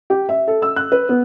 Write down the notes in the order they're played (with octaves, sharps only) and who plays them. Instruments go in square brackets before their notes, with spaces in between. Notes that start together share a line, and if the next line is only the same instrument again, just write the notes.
[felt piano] G4
E5
A4
E6
F#6
B4
B3